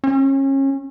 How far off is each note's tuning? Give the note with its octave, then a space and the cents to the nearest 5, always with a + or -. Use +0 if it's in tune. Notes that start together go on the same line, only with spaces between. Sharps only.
C#4 -30